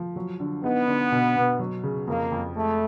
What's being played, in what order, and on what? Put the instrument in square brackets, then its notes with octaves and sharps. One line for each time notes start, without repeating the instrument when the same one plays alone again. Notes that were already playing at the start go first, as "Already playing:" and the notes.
Already playing: [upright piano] F3
F#3
D3
[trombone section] B3 [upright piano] D#4
[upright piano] D3
B2
B2
F#3
C#3
[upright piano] F2 [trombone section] A#3
[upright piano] F2
[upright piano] G#3 [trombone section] A3